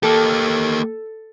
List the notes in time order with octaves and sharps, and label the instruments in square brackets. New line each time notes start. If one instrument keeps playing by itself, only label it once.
[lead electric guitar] A#3 G4 [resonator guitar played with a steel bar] A4